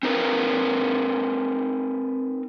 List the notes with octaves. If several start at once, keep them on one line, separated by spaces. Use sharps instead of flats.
C4 D#4 A#4 B4